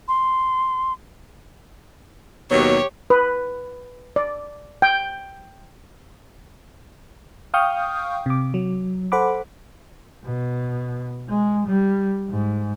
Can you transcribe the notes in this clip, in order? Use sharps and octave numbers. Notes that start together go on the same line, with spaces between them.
C6
D#2 B2 F#3 G4 C#5
B4
D5
G5
F5 G5 C#6 D#6 F6 G6
C3 D6
F#3
A4 C5 F#5 B5 D6
B2
G#3
G3
G#2